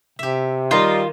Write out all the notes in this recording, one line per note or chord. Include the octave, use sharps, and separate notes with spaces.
C3 G4 E5
D#3 G3 F4 A#4 D#5